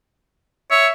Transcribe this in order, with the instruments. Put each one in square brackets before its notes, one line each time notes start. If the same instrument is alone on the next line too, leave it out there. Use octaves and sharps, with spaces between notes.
[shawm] C#5 [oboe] E5